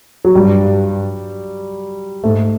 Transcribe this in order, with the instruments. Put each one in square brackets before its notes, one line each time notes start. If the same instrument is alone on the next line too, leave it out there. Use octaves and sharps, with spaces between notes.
[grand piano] F#3
[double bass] G2 [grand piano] G3
[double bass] G#2 [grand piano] A3